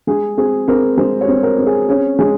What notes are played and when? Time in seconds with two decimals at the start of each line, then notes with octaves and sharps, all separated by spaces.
0.07 G#3 G#4
0.37 C4 G#4
0.68 C4 A#4
0.97 G#3 C5
1.21 C#5
1.28 C4
1.43 A#4
1.58 C4
1.66 G#4
1.88 C#4 G#4
2.19 G#3 G#4